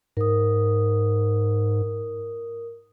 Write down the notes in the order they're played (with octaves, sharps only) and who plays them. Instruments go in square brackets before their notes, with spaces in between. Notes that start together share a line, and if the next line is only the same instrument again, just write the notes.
[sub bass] G#2 [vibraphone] A#4 D#6